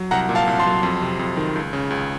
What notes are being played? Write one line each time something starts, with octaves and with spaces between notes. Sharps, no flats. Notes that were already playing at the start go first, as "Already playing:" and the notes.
Already playing: F#3
C2 F#5 A#5
A#2
F5 A5
C2
A5 C6
F#3
F2
C3
F2
D#3
C#2
C#3
C#2